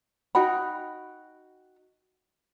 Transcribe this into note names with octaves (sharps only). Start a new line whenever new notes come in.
D#4 F#4 G5 B5